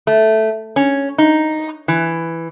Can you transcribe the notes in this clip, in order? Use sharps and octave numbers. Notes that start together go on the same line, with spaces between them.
A3
C#4
D#4
E3